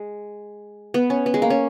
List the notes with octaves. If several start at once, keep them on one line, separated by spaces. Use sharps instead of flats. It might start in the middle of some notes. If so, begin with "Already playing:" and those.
Already playing: G#3
B3
C#4
B3
G#3
A#3
C#4